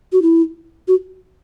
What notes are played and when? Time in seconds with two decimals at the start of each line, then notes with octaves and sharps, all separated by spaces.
0.13 F#4
0.22 E4
0.88 F#4